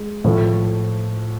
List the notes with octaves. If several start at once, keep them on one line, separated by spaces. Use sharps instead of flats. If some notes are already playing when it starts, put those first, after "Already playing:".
Already playing: G#3
A2 F3 A3